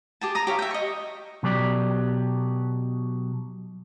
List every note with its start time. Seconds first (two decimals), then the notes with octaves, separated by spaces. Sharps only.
0.21 G4 G#4 A5
0.35 A#5 D#6
0.47 G4 C#5 E5 F5
0.59 E5 G5
0.71 D#5 C#6
1.43 B2 F#3 G4 D5